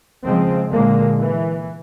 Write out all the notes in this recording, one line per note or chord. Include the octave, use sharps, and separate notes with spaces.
C#3 F3 G#3 C4
A#2 D3 G#3 A#3
E3